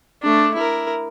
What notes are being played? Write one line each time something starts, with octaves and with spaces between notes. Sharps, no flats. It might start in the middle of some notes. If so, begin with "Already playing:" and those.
A3 D4
E4 A#4